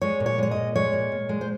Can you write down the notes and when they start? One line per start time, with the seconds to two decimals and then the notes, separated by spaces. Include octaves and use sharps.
0.02 G#3 C#5
0.20 A#2
0.26 C#5
0.38 G#3 C#5
0.51 D#5
0.56 A#2
0.75 G#3 C#5
0.93 A#2
1.12 A#2
1.29 G#3
1.41 C5